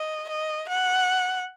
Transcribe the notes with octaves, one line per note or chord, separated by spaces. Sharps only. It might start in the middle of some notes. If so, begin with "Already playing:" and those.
Already playing: D#5
D#5
F#5